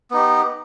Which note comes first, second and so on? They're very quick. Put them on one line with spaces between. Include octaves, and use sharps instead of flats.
B3 D#4 G4